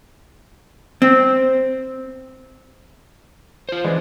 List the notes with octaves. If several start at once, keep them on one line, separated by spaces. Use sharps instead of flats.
C4
F4 C5
E3 G#3 B3 D4